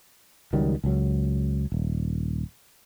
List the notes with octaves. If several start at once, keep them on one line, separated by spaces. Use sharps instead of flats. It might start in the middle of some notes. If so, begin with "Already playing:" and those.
C#2 D#3 F#3 G3
C#2 F#3
D#1